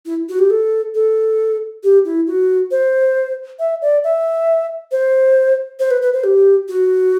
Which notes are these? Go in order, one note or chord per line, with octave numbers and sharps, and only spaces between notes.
E4
F#4
G4
A4
A4
G4
E4
F#4
C5
E5
D5
E5
C5
C5
B4
B4
C5
G4
F#4